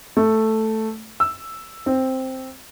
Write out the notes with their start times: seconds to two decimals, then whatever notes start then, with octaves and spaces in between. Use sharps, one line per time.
0.17 A3
1.20 E6
1.86 C4